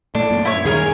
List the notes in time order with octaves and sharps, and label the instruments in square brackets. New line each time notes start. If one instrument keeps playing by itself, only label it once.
[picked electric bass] A#2 A3 [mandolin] D4
[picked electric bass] F#2 A#2
[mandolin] E4 C#5
[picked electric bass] D#1 F#2 D#3 [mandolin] G#4 A#4 C#5